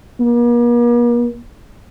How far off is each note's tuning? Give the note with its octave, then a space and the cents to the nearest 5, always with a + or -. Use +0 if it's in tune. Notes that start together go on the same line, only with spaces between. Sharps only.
A#3 +45